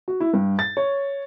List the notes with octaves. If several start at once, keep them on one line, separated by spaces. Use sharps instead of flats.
F#4
E4
G2
A6
C#5